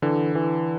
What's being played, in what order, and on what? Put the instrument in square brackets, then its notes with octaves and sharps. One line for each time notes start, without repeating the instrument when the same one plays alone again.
[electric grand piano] D3 [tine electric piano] E3
[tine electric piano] E3